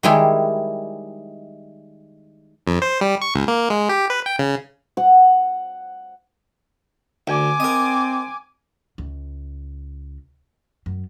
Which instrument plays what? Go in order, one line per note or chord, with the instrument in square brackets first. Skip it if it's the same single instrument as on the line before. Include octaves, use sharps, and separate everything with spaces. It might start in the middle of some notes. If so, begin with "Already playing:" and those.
[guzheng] D#3 G3 G#3 E4 G#4
[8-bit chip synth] F2
C5
G3
C#6
C#2
A#3
G#3
G4
B4
G5
C#3
[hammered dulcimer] F#5
[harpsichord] D2 [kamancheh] G#5 D6
[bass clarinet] C4 [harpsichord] A#4 D#5
[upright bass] C#2
F#2